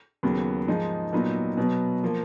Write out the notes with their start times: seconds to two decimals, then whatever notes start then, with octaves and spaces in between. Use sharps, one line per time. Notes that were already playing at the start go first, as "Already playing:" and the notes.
0.23 D#2 C#3 F#3 B3
0.68 G#2 F3 G#3 D#4
1.13 A#2 F#3 B3 D#4
1.57 B2 F#3 B3
2.04 F3 A#3